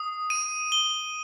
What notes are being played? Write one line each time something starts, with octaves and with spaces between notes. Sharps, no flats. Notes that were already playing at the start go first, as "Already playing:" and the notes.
Already playing: D#6
D#7
G7